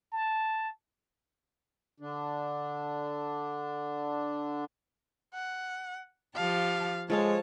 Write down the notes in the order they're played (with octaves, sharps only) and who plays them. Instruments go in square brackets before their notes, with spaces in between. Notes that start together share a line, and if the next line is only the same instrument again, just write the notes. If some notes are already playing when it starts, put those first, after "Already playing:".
[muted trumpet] A5
[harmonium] D3 D4
[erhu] F#5
[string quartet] F3 G4 A5 [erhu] F5
[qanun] F3 A4 F5 [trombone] G#3 [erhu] C#5 [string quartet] A5